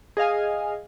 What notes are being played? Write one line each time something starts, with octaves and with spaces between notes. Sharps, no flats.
G#4 D#5 F5 G#5